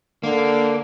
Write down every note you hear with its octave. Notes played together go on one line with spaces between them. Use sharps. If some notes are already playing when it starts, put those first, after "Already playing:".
D3 A#3